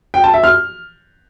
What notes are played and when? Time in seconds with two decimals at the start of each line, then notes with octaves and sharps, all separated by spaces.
0.14 G5
0.24 A5
0.34 E5
0.44 F6